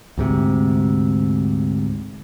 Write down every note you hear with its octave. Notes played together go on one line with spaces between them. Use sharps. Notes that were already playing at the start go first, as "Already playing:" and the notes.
D2 G#2 C3